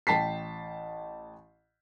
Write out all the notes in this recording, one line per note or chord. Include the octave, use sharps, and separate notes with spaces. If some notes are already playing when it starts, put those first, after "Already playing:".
A1 G5 A5 B6 C7